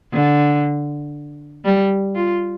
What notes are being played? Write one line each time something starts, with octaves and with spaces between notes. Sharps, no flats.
D3
G3
F4